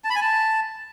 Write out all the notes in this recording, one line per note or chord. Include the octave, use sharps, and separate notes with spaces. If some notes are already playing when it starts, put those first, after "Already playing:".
A5
B5
G#5
A5